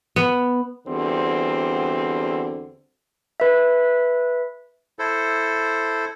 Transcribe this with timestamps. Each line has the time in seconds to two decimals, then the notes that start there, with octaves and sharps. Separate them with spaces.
0.16 B3
0.87 E2 D3 G3 C4 F#4 C5
3.40 B4 E5
4.99 E4 A4 C5